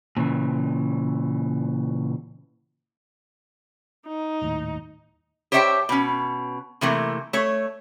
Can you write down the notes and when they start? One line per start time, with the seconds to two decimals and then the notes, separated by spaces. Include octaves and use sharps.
0.17 A#2 C#3 E3
4.07 D#4
4.42 D#1 D#2 A2
5.52 G4 C5 C#5 E5 G5 A5
5.89 B2 C#4
6.81 C3 E3 A3 A#3
7.33 A3 C#5